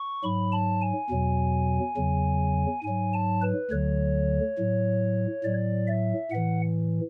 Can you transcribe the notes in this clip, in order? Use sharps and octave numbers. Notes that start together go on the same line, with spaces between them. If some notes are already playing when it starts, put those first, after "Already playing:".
Already playing: C#6
G#2 F#3 B5
A5
G#5
E2 B2 F#3
E2 C#3 F#3
G#2 F#3 G#5
A5
B4
D2 D3 F#3 C#5
A2 F#3
A2 F#3 D5
E5
A2 E3 F#5